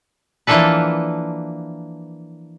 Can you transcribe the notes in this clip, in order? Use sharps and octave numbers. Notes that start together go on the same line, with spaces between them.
E3 F3 A#3 D4 A4 B4